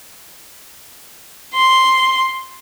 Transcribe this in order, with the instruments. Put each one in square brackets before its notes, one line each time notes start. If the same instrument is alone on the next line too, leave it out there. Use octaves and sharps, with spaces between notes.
[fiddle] C6